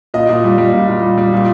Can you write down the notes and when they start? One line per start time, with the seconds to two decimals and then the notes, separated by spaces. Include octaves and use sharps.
0.14 A#2 D#5
0.29 A#2
0.44 G3
0.58 G3
0.72 A#2
0.88 A#2
1.03 G3
1.18 G3
1.33 A#2